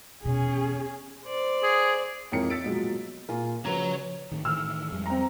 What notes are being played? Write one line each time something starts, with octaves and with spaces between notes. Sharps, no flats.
E2 B2 C#4 G#4
C5 D5
G#4
F2 G#2 E3 A#4 C#5 C#7
E6 A6 B6 D7
B2 F3 F#3 G#3 A#3 B3
A#2 F4 G#4 A#4
C#3 F3 C#4 F#4 B4 C#5 A#5
A2 D#3
A2 D#3 E3 E6 F6
F2 G3 G#3
C4 A#5